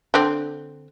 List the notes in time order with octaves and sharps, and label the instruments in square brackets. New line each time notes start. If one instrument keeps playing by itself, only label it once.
[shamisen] D3 C4